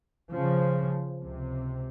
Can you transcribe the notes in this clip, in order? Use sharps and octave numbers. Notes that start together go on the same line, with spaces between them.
C#3 F3
C#2 C3